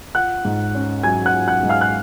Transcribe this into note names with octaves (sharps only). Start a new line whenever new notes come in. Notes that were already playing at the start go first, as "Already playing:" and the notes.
F4 F#5 F#6
G#2
C#4
F#3 G#5 G#6
F#5 F#6
F4
F#5 F#6
G#2
F5 F6
F#6